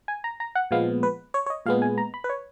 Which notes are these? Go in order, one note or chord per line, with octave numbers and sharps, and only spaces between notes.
G#5
A#5
A#5
F#5
A#2 F3 G#3 B3 F5
B4
C#5
C#5
D#5
A#2 G#3 B3 F5
G#5
A#5
B5
B4
C#5